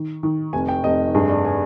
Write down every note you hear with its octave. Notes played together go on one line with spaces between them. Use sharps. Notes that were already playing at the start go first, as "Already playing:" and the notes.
Already playing: D#3
D#3
F1 G#5
G5
F1 D#5
G2 G#4
D5
G#5